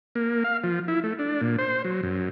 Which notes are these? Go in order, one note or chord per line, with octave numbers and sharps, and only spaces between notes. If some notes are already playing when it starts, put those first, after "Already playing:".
A#3
F5
F3
E4
A3
D4
A#2
C5
F#3
F#2